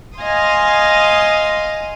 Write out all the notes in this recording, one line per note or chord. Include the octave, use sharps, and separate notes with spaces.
D#5 F5 G#5 C6 D#6